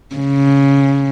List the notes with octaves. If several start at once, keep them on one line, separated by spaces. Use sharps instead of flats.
C#3